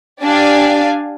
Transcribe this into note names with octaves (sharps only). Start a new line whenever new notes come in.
D4 G4 D5 F5 G#5